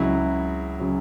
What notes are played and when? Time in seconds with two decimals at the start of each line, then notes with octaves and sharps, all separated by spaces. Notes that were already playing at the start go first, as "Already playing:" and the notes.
Already playing: C#2 C#3 F#3 E4
0.80 C#3 F#3